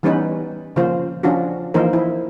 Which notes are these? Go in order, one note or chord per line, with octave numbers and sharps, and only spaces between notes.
E3 G3 B3 C#4 D#4 B4
C#3 F3 A#3 F4 C5
F3 C#4 D4 F4 F#4
E3 F3 A#3 D#4 A#4 C5
E4